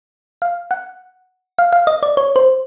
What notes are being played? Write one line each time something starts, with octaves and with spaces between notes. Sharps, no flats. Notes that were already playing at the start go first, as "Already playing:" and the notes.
F5
F#5
F5
F5
D#5
D5
C#5
C5